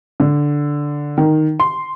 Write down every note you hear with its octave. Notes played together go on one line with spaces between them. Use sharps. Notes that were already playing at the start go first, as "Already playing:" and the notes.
D3
D#3
C6